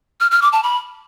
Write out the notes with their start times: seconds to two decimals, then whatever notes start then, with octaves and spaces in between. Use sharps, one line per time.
0.20 F6
0.31 F6
0.42 D6
0.52 A5
0.63 B5